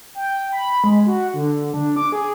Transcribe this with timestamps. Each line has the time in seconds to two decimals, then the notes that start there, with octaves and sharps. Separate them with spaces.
0.15 G5
0.52 B5
0.84 G#3
1.06 F#4
1.34 D3
1.74 D4
1.96 D6
2.12 G#4